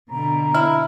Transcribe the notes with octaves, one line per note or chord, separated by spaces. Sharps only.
B2 D3 A#5
E4 F6